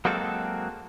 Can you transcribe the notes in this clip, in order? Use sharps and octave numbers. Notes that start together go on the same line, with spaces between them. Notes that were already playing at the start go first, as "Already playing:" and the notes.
F#3 G#3 A#3 C4 F#4 A4